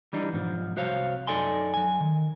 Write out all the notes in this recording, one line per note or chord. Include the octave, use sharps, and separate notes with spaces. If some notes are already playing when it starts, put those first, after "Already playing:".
E3 G3 D4 D#4
B1 G#2 F3
C2 F#4 C5 C#5 F5
F#2 D#4 A4 D5 G#5 C6
F#3 G#5
D#3